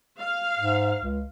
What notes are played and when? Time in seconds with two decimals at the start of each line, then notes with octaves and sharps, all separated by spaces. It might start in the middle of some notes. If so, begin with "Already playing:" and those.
0.19 F5
0.59 G#2
1.01 C#2